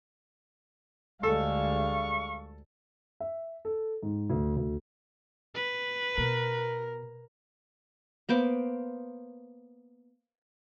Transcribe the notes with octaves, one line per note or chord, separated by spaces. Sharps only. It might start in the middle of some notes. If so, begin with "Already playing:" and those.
D2 G3 G#3 A4 F5 C#6
E5
A4
G#2
D2
D2
B4
B2 A#4
A#3 B3 C5 D6